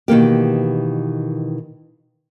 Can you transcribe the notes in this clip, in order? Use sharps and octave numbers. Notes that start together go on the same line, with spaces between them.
B2 D#3 E3 A#3 G4